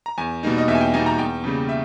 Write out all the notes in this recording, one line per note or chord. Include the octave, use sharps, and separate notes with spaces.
A#5
E2 G#5
B2 G3 A#3 D#4
D#5
E2 E5
G#5
G5
B2 G3 A#3 D#4 G#5
A#5
E2 G5
C#3 G3 A#3
E5